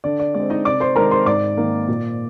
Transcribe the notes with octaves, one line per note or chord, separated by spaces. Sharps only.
D3 D5
D5
G#3 C4 D5
D#4 D#5
C3 D5 D6
C5 C6
D#3 G#3 C4 A#4 A#5
C5 C6
G#2 D5 D6
D#3 A#3
A#2